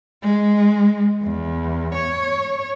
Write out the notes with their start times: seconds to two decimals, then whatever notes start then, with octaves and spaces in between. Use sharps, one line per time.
0.22 G#3
1.23 E2
1.94 C#5